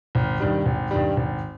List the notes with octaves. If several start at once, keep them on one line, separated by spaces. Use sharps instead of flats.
G#1
G2 D#3 G3
G#1
G2 D#3 G3
G#1